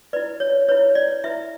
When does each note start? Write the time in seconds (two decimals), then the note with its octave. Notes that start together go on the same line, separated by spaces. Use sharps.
0.13 E4 B4 D5
0.40 C#5
0.68 E4 B4 C#5
0.95 D5
1.24 E4 B4 E5